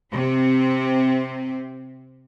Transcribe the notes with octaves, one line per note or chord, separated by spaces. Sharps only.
C3 C4